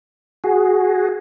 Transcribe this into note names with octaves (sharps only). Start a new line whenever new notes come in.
F#4 G#4